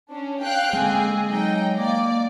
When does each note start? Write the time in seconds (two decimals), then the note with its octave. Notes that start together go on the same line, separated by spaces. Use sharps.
0.10 C#4 D4
0.43 F5 G5 F#6
0.73 D3 G#3 A#3 C4 G#4
1.28 F#3 D#4 D#5 G5
1.78 A#3 D5